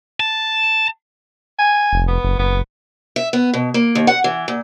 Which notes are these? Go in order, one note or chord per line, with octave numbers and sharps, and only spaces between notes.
A5
G#5
F1
B3
F#1
F#1 B3
E5
B3
B2
A#3
D#2
F#5
E3
A#2